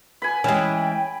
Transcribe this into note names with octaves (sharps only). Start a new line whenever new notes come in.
B4 G#5 B5
E3 G#3 C#4 G5